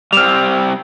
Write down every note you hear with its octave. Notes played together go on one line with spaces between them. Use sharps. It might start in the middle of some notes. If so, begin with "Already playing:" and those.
G3 C4 F6 E7 F7